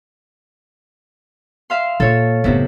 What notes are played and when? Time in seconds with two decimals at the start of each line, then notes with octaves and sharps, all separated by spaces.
1.70 E5 F5 C6
2.00 A#2 A#3 A4 C#5
2.44 F#1 A2 C3 B3 E4